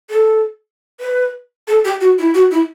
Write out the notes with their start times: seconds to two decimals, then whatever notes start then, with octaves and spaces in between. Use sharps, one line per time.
0.10 A4
1.00 B4
1.67 A4
1.85 G4
2.01 F#4
2.18 E4
2.34 F#4
2.51 E4